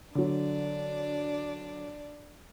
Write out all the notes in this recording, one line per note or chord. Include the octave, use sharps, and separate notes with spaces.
D3 F#3 D4 D5